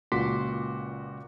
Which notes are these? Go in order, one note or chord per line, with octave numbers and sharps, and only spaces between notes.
C#2 A#2 F#4 C6 D6 B6